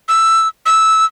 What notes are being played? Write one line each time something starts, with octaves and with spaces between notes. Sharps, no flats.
E6
E6